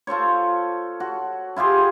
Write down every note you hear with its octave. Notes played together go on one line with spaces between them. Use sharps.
F4 A4 C5 C#5
F#4
E4 F4 G4 G#4